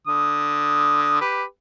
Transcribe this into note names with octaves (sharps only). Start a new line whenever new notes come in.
D3 D#6
G4 B4